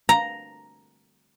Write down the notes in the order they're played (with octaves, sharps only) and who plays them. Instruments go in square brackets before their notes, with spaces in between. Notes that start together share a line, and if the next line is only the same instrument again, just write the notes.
[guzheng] A#5